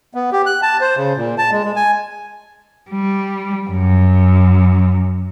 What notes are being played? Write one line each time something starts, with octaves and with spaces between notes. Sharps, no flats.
B3
G4
F#6
A5
C5
C#3
A#2
A5
G#3
G#3
G#5
G3
F#2